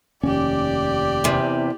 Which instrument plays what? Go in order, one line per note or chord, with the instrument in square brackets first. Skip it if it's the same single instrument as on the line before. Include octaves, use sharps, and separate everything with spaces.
[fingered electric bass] F1 D#2 C#4 [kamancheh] G4 D5
[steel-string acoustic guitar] E2 C3